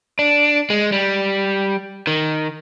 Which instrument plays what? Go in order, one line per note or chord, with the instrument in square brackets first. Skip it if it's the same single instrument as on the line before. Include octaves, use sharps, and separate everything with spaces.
[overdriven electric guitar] D4
G#3
G3
D#3